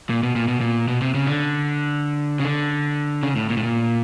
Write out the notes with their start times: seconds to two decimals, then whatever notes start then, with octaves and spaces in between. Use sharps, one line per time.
0.10 A#2
0.23 B2
0.36 A#2
0.48 B2
0.61 A#2
0.88 B2
1.02 C3
1.14 C#3
1.27 D3
2.40 C#3
2.45 D3
3.23 C#3
3.36 A2
3.50 A#2
3.57 A2
3.63 A#2